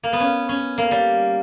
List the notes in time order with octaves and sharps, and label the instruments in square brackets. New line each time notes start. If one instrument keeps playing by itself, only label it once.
[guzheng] A#3
B3
C#4
C#4
A#3
G3